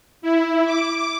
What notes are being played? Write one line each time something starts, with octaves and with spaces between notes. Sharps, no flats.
E4
D6